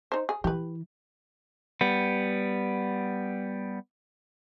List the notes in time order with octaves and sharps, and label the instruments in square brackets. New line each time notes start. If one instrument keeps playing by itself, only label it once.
[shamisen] D#4 C5
G#4
[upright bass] E3 [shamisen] G4 B4
[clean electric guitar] G3 B3